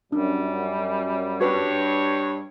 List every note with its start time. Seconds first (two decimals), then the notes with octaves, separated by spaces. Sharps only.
0.12 F#2 G3 D4
1.41 G2 F#4 B4 C#5